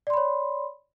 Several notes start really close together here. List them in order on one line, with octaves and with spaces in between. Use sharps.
D5 C6 B5 C#5